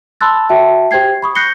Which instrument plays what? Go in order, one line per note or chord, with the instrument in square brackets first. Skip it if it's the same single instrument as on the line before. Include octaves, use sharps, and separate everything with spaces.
[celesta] A5 B5 C6 E6 F#6 A6
F#4 E5 G5 A5
G4 C5 G5 G#6 C7
B5 C#6 D#6
F#6 G6 A#6 C7 C#7 G7